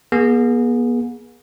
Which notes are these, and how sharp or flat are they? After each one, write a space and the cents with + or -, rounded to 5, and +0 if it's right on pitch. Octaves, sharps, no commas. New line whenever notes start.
B3 -45 G#4 +0